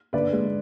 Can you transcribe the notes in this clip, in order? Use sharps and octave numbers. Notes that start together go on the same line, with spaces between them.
D3 B4 D5
G#3